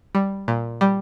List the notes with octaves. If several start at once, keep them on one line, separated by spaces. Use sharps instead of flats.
G3
A#2
G3